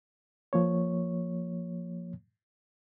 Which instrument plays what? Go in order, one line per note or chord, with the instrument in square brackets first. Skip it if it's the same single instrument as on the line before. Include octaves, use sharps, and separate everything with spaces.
[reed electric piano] F3 A#3 C#5